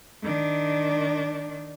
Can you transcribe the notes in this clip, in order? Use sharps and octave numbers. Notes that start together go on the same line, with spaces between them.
D#3 D4